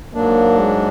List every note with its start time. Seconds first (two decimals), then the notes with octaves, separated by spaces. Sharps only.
0.15 G#2 F#3 A#3 D4
0.59 G#3